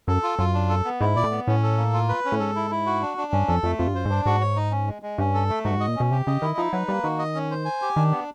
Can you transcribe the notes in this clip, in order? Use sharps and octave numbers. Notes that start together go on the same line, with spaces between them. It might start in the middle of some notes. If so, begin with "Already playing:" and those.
F#2 A4
F4
F#2 F4
D4
A4
B3
G#2 E4
A#2 D5
A2
B3
A2 C#4
A4
A#3
F4
B4
C#4
A2
G#2 A4
E4
E4
F#4
D4
D4
G2 C#4
F2 A4
F2 A3
F2 F4
G2
F#2 C5
G#2
G2 D4
G#2 F#4
C#5
D#4
C#4
G#3
G#3
G2 C#4
A4
A3
G#2 F#4
G2
G#2
D#5
A#2
B2 C#4
C3 G4
C#3 D#5
D#3 E4
F3 D#4
F#3 B4
G3 A#3
D#3 F#4
D#5
C#4
C5
G#5
G4
D#3 D4
B3